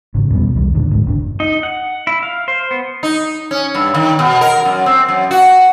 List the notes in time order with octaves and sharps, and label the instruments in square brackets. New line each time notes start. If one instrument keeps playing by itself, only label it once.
[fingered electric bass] G#1 C#3
E2 B2 G3 B3
C2 F2 D#3 G3
D#2 A#2 D3
G#1 D2 G#2
F#1 C#4 D4
[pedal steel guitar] D#4
F#5
E4
F5
C5
B3
[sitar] D#4
C#4
G2
D#3
B2
A#4
F#2
C4
F#2
F#4